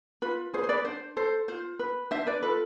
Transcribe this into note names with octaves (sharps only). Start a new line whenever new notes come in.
F4 B4
G#4 B4 C5
C5
B4 D5
D4 C5
A4 C5
F4 C5
B4
D4 C5 E5
B4 D5
F4 A4 B4